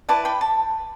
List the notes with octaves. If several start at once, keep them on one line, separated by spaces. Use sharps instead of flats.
E4 B4 D5 A5 D6
G5 B5
A5